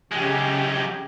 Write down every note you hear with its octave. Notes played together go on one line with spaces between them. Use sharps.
F#2 C#3 G#3 G4